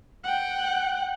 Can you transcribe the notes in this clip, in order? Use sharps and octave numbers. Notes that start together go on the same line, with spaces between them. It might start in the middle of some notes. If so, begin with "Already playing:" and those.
F#5 G5